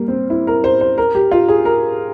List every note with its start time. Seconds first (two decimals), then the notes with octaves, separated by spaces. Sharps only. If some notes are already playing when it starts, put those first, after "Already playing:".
Already playing: G3 A#3
0.08 C4
0.30 E4
0.47 A#4
0.64 C5
0.81 C5
0.98 A#4
1.15 G4
1.31 F4
1.49 G#4
1.65 A#4